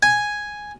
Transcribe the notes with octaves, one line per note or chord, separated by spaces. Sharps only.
G#5